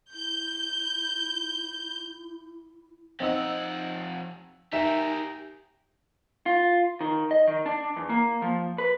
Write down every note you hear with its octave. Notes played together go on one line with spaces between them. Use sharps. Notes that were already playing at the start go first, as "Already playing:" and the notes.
E4 G6
F2 C4 D#4 F#5 E6
D#4 G4 A#4 E5 G#5 E7
F4
D#3
D#5
D#3
D4
E2
A#3
F3
B4